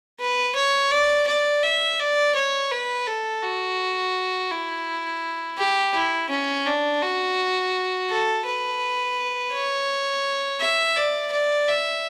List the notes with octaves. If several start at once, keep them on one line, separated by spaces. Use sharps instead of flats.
B4
C#5
D5
D5
E5
D5
C#5
B4
A4
F#4
E4
G4
E4
C#4
D4
F#4
A4
B4
C#5
E5
D5
D5
E5